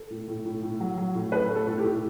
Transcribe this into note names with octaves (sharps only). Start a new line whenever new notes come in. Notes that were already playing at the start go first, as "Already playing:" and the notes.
Already playing: A4
A2
A2
A2
A2
F#3
F#3
A2
A3 B4
A3
A4
A2
G4
A2